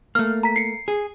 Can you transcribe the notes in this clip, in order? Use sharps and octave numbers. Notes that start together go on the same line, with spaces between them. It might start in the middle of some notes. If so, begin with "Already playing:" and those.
A3 A#3 F6
A#5 B6
C7 C#7
G#4